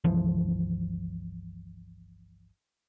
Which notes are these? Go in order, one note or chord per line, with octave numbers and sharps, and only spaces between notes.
G1 C#2 E3 F3